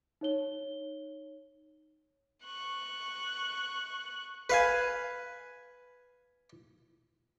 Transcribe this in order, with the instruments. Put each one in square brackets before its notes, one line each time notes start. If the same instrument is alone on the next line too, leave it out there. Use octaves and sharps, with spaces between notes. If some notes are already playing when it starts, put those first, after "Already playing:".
[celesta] D#4 C#5 G7
[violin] C#6 F#6
[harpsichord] B4 F5 G#5